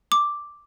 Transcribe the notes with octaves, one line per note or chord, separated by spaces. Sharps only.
D6